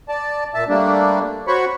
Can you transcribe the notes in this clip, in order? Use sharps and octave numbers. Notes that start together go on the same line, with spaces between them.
D5 A5
A#2 E5 A5
G3 A3 A#3 D4
F#4 C5 C#5 B5 C#6